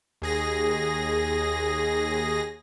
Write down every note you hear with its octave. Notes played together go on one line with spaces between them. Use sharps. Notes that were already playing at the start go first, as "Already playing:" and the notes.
D#2 G#4 A#6